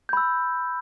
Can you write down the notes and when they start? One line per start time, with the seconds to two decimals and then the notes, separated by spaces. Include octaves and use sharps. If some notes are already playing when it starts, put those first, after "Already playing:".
0.09 G6
0.13 B5
0.17 E6